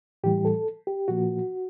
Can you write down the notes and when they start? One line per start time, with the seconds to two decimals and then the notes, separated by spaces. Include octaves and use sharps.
0.24 A2 E3 G3 G4
0.45 A4
0.87 G4
1.08 A#2 F3 A#3 F#4